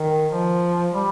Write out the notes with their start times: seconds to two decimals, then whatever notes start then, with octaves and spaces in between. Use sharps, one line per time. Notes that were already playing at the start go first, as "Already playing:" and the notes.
Already playing: D#3
0.31 F3
0.93 G3